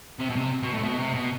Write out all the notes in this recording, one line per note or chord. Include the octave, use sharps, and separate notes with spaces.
C3
B2
C3
B2
A2
B2
C3
B2